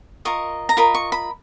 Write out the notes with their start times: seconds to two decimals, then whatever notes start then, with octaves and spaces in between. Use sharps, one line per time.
0.25 F4 A#4 D#5 C#6
0.69 A#5
0.77 F4 A#4 D#5 B5
0.95 C#6
1.12 B5